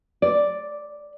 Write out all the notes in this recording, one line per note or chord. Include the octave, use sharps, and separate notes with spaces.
D5